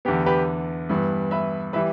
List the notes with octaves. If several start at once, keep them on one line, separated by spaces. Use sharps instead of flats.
E2 D3 B3 G4
G4 B4
G2 E3 B3
B4 E5
E3 G3 B4 E5